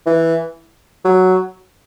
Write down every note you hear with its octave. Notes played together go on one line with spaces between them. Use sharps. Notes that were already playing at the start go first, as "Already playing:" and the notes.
E3
F#3